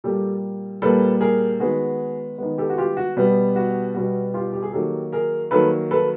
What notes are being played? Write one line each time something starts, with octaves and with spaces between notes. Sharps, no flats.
A#2 G3 A#3 G4 A4
A#2 G3 A#3 A4 B4
G#4 A#4
D#3 G#3 B3 F#4 G#4
D#3 G#3 B3
G4 A4
F#4
F4 G4
F#4
B2 G3 B3
F#4
B2 G3 B3 F#4
F4 G4
G4
G#4
D#3 F#3 A#3 G4 A4
G#4 A#4
D#3 F#3 A#3 A4 B4
A4 B4